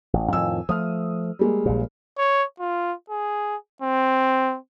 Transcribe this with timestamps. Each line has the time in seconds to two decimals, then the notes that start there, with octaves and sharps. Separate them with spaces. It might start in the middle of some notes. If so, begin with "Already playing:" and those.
0.13 A1
0.33 F2 A2 D#3 G#5 E6
0.69 F3 A3 D#6 F6
1.39 G3 G#3 A#3
1.66 A#1 A#2
2.18 C#5
2.60 F4
3.10 G#4
3.82 C4